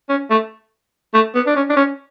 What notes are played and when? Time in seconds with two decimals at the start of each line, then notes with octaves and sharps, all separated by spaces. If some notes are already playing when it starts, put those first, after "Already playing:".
0.09 C#4
0.30 A3
1.14 A3
1.35 B3
1.46 D4
1.56 C#4
1.69 D4
1.76 C#4